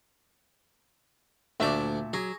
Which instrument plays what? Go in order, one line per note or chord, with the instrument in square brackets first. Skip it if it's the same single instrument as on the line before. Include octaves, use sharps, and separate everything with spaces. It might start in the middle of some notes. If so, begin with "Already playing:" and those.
[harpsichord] D2 D4 D5 [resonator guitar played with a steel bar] A#2 A3 E5
[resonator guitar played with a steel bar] F#3 [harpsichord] G#4